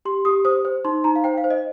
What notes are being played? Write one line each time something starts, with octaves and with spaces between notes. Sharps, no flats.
G4 C6
G4 D#6
C5 D#6
C5
D#4 C6
D#4 A#5
F5
C5 G5
F5
C5
D#5